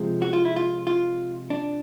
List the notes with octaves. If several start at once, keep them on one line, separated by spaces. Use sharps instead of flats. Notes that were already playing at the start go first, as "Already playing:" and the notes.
Already playing: C3 F3 G#3
F#4
F4
E4
F4
F4
D4